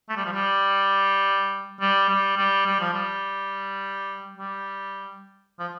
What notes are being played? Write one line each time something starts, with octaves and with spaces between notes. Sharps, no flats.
A3
G3
F3
G3
G3
G3
G3
G3
F3
G3
G3
F3